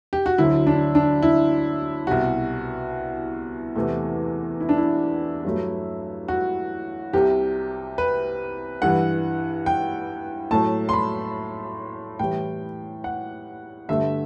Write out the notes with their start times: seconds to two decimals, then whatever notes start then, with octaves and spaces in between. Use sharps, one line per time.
0.13 G4
0.26 F#4
0.38 D2 D3 F#3 E4
0.67 D4
0.95 D4
1.22 E4
2.07 C2 B2 G3 F#4
3.75 E2 C3 E3 A3
4.60 E4
4.69 D4
4.77 E4
5.44 G2 F#3 A3
6.28 F#4
7.13 C2 C3 G3 G4
7.98 B4
8.82 G2 E3 G3 F#5
9.66 G5
10.51 A2 F#3 A3 A5
10.89 C6
10.93 B5
12.19 A2 E3 G3 G5
13.04 F#5
13.89 G2 D3 A3 E5